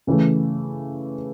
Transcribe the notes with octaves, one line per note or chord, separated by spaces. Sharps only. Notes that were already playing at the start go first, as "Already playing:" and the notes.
C#3 E3 A3